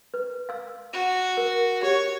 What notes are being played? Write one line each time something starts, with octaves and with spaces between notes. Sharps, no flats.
B4
F5 E6
F#4
A#4
G4 C#5